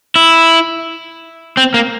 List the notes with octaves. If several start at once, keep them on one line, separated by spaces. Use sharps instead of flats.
E4
C4
A#3